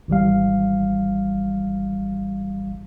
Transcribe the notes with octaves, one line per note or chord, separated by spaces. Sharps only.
G#1 E3 G3 F5